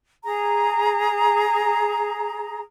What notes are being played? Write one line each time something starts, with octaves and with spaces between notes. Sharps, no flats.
G#4 A#5